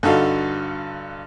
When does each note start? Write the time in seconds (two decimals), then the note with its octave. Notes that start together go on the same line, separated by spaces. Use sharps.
0.03 G2 D3 D#4 F#4 A4 F5